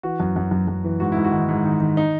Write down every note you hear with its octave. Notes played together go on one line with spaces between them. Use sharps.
E3 F#4
F#2
F#2
F#2
F#2
E3
G#2 F#4
G#2 E4
F#4
D#3
G#2
D#3
D#3
D#4